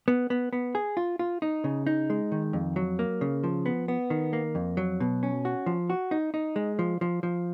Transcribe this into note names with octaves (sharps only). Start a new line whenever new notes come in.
B3
B3
B3
G#4
F4
F4
D#4
C#3
D#4
G#3
D#3
F2
F#3
A#3
C#3
F3
B3
B3
D#3
A#3
F2
F#3
B2
C#4
F#4
F3
F#4
D#4
D#4
G#3
F3
F3
F3